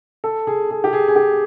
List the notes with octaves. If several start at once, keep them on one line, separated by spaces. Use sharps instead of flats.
A4
G#4
G#4
G4
G#4
G#4
G4